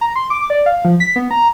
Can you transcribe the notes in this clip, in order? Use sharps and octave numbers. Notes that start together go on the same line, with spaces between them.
A#5
C6
D6
D5
F5
F3
B6
B3
A#5